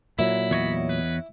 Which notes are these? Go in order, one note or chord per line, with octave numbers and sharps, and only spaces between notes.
A#2 F#3 E4 B5
E2 C#5 D#5
B4